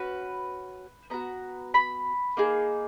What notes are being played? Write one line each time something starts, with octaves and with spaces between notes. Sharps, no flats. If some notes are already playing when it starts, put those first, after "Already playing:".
Already playing: C#4 F#4 B4
B3 F#4 A#5
B5
A#3 D#4 G#4